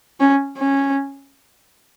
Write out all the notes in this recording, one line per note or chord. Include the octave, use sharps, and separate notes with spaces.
C#4
C#4